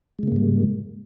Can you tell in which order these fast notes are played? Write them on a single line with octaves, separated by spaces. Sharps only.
G#3 C#3 A#3 G#2 G3